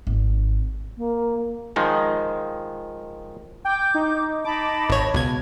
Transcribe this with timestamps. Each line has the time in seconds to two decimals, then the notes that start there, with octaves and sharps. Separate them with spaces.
0.07 G#1
0.97 A#3
1.76 D#3 F3 G#3 D#4
3.65 G5 D6 G6
3.94 D#4
4.45 D#4 A5 B5 D6
4.89 G#1 C#5
5.14 C#2 B2 G#6